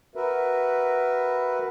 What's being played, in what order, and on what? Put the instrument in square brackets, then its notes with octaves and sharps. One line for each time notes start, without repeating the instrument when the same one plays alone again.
[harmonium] F#4 A#4 B4 E5